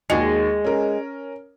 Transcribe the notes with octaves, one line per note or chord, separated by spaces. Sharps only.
D#2 G#3 F#4 C#7
C#4 A#4